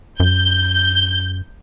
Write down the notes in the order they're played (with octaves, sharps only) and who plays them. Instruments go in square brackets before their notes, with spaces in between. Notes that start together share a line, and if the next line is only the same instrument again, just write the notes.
[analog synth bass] F#2 [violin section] G6